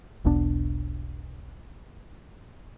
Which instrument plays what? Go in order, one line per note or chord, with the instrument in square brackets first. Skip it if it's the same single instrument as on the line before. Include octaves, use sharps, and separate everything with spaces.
[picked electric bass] E1 B1 B3 D4